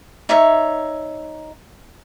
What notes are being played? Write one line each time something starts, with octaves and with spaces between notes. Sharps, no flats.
D#4 C#5 E5